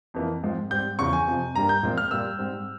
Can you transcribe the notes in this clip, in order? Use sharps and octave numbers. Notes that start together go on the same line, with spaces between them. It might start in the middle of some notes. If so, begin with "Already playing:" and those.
F2 E3 A#3
G#2 F3 G#3 C4
G#2 G3 C4 G6
E2 C#3 F3 C#6
G#5
F2 C3 F3
G2 G3 A#3 A#5
G6
A#2 F3 G#3 C4
F6
A#2 G3 A#3 E6
G#2 G3 C4